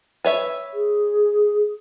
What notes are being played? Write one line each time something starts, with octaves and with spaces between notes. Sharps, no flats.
B4 C#5 E5
G#4